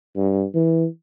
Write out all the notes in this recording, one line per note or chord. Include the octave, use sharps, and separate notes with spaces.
G2
E3